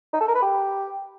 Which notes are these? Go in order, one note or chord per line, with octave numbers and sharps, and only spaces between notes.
D#4
A4
A#4
B4
G4